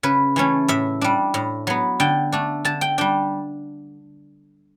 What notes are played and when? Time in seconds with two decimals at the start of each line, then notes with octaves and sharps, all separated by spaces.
0.03 C#3 B4
0.36 E3 A3 C#4
0.68 A2 E5
1.01 G3 D4
1.34 A2
1.67 F#3 B3
2.00 D3 G5
2.32 A3 D4
2.65 D3 A5
2.81 G5
2.98 G3 D4 G5